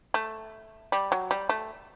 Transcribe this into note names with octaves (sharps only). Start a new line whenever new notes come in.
A3
G3
F#3
G3
A3